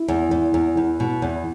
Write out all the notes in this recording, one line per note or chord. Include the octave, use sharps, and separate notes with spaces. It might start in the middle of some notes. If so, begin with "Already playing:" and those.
Already playing: E4
E2
E2
E2
E2
B2
E2